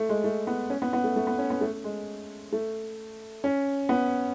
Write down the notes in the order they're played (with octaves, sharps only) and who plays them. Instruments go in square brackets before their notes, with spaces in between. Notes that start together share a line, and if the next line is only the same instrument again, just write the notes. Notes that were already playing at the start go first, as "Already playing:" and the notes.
Already playing: [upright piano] A3
G#3
A3
B3
C#4
B3
B3
A3
A3
B3
C#4
B3
A3
G#3
A3
C#4
B3